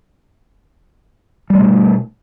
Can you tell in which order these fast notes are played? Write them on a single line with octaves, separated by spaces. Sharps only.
G3 A3 B2